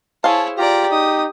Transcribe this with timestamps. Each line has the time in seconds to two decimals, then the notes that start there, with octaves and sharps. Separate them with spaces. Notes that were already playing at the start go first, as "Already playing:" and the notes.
0.24 E4 G#4 C5 C#5 F5 A5
0.58 F4 G4 D5 A#5
0.91 D#4 D#6